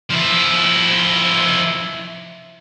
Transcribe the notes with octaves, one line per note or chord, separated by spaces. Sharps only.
F3 E4